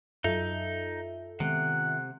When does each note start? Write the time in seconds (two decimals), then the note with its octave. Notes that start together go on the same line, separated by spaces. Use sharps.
0.24 F#2 F#3 D#4 F4 A4 E5
1.40 C3 D#3 G#3 B3 F#5